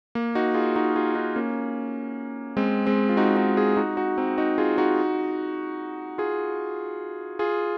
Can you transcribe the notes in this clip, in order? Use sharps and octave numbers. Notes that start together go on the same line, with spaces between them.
A#3
D#4 F#4
F4 G#4
D#4 F#4
F4 G#4
D#4 F#4
A#3 C#4
G#3 C4
G#3 C4
F4
D#4 F#4
D#4 F#4
F4 G#4
D#4 F#4
D#4 F#4
C4 D#4
D#4 F#4
F4 G#4
D#4 F#4
F4 G#4
F4 G#4